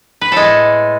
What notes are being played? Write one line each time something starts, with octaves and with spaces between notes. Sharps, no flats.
B4
A2 G#3 A4